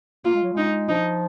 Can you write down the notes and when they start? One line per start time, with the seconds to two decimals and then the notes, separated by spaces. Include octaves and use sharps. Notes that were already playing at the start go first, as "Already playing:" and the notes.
0.25 A#3 F4
0.34 G#3
0.43 F#3
0.53 G#3 D#4
0.89 F3 D#4